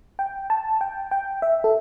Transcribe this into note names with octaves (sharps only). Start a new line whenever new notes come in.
G5
A5
G5
G5
E5
A4